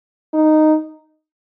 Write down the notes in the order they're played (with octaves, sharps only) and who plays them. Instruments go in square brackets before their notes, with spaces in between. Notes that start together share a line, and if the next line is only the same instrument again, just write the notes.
[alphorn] D#4